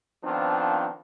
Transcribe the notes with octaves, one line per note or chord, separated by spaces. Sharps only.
D#3 F3 B3 C4 D4 F4